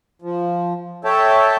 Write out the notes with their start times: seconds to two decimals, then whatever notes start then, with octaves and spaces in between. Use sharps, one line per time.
0.22 F3
1.04 A4 C#5 E5 G5 A5